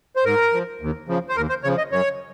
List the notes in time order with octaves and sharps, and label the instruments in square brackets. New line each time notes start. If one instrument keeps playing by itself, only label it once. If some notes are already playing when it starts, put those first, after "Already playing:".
[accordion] C5
G#2 A#4
F3
D#2
C#3 F3
C5
D#2 A#4
C5
C#3 F3 C#5
D#5
F#2 C#5